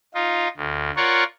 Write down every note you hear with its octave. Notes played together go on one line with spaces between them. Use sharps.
D#4 F4
D2
F4 A#4 C#5 D5 F#5